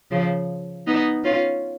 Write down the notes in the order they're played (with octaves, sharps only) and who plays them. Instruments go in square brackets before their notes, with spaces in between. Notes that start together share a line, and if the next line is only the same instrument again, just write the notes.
[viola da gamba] C#3 F3
B3 D#4
C#4 F4